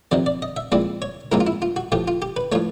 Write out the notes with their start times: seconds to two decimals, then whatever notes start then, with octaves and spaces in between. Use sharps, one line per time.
0.11 F2 C3 D#3 F#3 D5
0.26 D5
0.42 D#5
0.57 E5
0.72 A#2 F3 G#3 C4 E4 D5
1.02 C#5
1.32 A#2 F3 G#3 C4 E4 A#4
1.40 F4
1.47 E4
1.62 F4
1.76 F#4
1.92 A2 F3 A3 G4
2.08 F4
2.22 G4
2.37 B4
2.52 A2 F3 A3 C#5